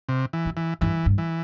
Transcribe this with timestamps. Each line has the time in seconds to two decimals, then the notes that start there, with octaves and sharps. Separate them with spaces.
0.09 C3
0.33 E3
0.45 F#2
0.57 E3
0.81 G2 E3
1.06 G2
1.18 E3